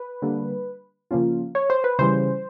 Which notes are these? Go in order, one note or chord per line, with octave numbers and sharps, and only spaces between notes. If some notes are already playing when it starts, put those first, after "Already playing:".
Already playing: B4
D3 G3 A#3
C#3 F3 A#3 C#4 F4
C#5
C5
B4
C#3 E3 G3 C5